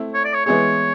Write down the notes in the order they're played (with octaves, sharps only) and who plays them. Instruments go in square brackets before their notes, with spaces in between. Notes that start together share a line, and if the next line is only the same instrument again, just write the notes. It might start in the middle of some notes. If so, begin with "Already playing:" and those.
Already playing: [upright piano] A3 C4 E4
[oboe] C#5
D5
C#5
[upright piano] E3 G#3 B3 E4 G#4 [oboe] C#5